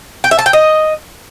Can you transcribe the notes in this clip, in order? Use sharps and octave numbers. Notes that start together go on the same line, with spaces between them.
G5
E5
A5
G5
D#5